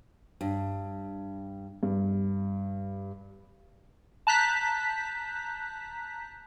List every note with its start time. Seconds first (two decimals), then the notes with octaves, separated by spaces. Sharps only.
0.41 G2
1.83 G2
4.27 A5 A#5 F#6 G6 B6